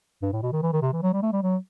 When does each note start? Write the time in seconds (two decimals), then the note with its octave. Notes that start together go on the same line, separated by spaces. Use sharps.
0.22 G2
0.33 A2
0.42 B2
0.53 D#3
0.63 E3
0.73 D#3
0.82 C3
0.92 E3
1.03 F#3
1.13 G3
1.22 A3
1.33 G3
1.43 F#3